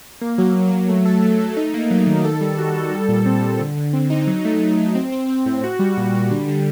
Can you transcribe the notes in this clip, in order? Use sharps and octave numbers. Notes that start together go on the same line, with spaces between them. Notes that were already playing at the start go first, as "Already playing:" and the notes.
A#3
F#3
A#3
F#3
A3
A4
A3
A3
D#4
A#3
F#3
D#3
A4
G3
F#4
A4
G3
A#2
C4
G3
D3
D3
C4
D#4
F#3
A3
A3
F#3
C4
C4
C4
A2
F#4
G3
A#2
G3
D3
D3